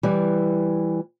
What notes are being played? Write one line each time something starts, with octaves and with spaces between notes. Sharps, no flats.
E3 G3